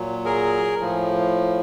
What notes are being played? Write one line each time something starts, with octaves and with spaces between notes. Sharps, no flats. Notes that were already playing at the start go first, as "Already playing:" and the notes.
Already playing: A#2 F#3
G#4 A#4
A2 F3